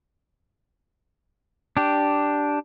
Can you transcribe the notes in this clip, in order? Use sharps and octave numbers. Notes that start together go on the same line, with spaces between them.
D4 G4